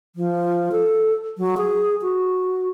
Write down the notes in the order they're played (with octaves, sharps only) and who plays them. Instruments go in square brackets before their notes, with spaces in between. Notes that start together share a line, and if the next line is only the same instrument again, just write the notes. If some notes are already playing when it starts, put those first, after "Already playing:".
[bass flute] F3
A4
F#3
G#4
F#4